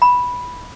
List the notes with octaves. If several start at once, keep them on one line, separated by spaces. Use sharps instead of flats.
B5